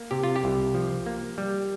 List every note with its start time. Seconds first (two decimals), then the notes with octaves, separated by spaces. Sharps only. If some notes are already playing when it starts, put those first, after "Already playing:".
Already playing: A#3
0.11 C3 G4
0.23 F4
0.36 G4
0.44 C2
0.74 F3
1.06 A#3
1.38 G3